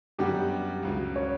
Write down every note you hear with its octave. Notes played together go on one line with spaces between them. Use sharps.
F#2 D3 G3 B3 F#4 G4
C#2 C#3 F#3
C#5